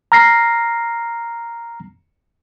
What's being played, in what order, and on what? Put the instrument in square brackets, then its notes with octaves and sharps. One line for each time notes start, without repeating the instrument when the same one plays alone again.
[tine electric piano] A#5 F6 A#6 C7